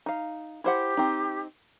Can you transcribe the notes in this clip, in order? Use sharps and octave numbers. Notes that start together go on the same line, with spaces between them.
D#4 F5
E4 G4 C5 F#5
C4 D#4